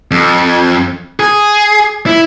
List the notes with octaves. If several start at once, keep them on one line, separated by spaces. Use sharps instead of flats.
F2
G#4
E4